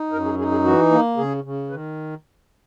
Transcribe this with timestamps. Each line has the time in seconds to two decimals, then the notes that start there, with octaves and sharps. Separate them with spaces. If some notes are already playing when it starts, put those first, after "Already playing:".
Already playing: D#4
0.12 F#2 A#4
0.25 G#4
0.39 D#4 G#4
0.51 G#4
0.65 E3 F#4
0.91 A#3
1.17 C#3 G#4
1.44 C#3
1.70 D#3 B4